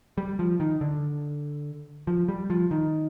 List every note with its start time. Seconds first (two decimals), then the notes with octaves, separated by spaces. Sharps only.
0.18 G3
0.39 F3
0.60 D#3
0.81 D3
2.07 F3
2.28 G3
2.50 F3
2.71 D#3